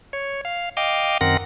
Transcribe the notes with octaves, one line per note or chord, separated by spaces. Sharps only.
C#5
F5
D#5 F5 G5 D6
F#2 D#3 C4 A#4 F#5 A#6